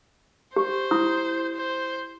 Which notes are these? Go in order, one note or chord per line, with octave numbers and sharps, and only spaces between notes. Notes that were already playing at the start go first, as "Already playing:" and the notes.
G4 C5
E4 D#6
C5